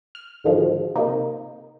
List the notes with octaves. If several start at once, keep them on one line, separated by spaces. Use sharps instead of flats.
F6
G#2 D3 D#3 F3 F#3 G#3
C3 A#3 D#4